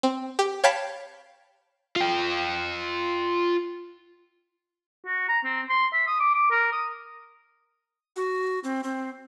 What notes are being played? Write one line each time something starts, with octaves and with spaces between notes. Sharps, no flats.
C4
G4
C#5 F5 G5 A5 B5 B6
F4 G5
F#4
A#5
C4
C6
E5
D#6
D6
D6
A#4
D#6
F#4
C4
C4